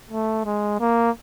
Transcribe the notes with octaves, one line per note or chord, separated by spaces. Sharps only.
A3
G#3
A#3